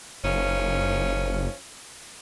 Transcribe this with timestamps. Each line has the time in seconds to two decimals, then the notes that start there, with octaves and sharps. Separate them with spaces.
0.24 F#1 D#3 F3 C#4